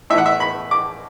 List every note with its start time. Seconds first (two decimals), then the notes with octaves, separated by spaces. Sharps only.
0.10 A2 E5
0.13 E3 F#5
0.26 E5
0.40 B5
0.71 D6